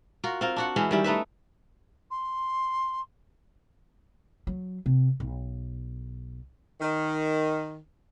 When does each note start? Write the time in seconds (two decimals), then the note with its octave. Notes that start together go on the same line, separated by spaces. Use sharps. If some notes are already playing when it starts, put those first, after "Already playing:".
0.24 F4 F#4 A#4
0.41 C4 F4 A#4
0.56 D4 F#4 F#5
0.76 E3 G#3 C#4 E4
0.91 D#3 G3 E4
1.04 A3 D#4 B4 E5
2.10 C6
4.47 F#3
4.86 C3
5.20 B1
6.81 D#3